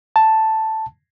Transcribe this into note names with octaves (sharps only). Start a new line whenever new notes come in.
A5